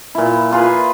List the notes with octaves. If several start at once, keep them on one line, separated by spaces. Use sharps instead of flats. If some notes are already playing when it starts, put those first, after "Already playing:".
A#2 E4
A#3 F4 G#4 B4